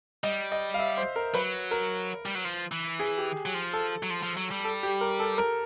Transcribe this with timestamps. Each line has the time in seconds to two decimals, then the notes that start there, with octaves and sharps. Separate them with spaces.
0.23 G3 D#5
0.52 D#5
0.74 F5
0.79 E5
0.97 C5
1.16 A#4
1.34 F#3 B4
1.71 A#4
2.26 G3
2.35 F#3
2.45 F3
2.72 E3
2.99 G#4
3.18 G4
3.46 F#3
3.54 F3
3.73 A4
4.03 F#3
4.10 F3
4.23 F3
4.37 F#3
4.51 G3
4.64 A4
4.83 G4
5.01 A#4
5.19 A4
5.38 A#4